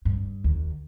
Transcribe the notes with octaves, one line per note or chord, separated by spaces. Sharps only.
G2
D#2